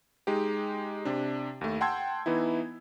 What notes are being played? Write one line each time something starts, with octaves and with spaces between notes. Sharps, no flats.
G#3 D#4 G4
C3 D4
D#2 A3
F#5 G5 A5 C6 E6 G#6
E3 B3 D#4 E4